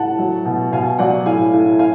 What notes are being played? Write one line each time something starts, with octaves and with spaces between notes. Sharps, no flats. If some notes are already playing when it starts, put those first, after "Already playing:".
Already playing: A2 F#5 A5
F#3
B2
B2 F5 G#5
F#3 D5 F#5
A2 F5 G#5
A2
F5 G#5